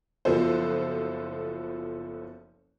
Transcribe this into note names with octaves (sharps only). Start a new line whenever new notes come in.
F#1 F3 B3 F#4 A4 C5